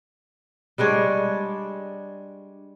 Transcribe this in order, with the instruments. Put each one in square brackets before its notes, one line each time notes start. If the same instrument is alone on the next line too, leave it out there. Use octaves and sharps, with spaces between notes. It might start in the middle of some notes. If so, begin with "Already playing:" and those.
[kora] G3 G#3 D4 C#5